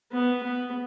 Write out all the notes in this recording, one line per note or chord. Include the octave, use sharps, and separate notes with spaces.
B3
B3